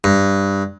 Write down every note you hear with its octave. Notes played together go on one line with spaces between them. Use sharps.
G2